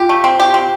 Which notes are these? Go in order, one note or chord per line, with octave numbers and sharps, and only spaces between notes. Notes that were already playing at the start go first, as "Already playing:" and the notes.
Already playing: F4 G4
A3
C4
G4
C4